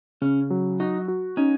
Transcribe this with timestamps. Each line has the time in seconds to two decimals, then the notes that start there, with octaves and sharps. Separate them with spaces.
0.22 C#3 C#4
0.50 F#3
0.80 D#4 F#4
1.08 F#4
1.37 C#4 D#4